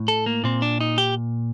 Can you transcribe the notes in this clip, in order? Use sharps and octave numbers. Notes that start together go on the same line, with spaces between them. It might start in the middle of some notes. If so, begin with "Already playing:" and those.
Already playing: A2
A4
A#3
A#2 C4
D4
D#4
G4